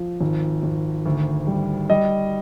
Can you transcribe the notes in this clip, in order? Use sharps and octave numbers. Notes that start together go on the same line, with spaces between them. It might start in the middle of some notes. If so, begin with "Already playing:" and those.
Already playing: F3
G#1
G#1
D2
G3
G3 D#5